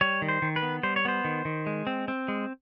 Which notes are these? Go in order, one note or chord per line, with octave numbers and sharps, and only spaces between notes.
G3 C#5
D#3
C5
D#3
B4
B3
G3 C5
C#5
B3 C5
D#3
D#3
G#3
C4
C4
G#3